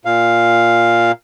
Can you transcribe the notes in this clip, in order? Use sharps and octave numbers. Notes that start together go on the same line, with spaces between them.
A#2 F5